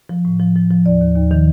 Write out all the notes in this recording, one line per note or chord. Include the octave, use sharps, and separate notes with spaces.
F3
A2
F3
F3
F3
D#2 D5
D#2
D#2
D#3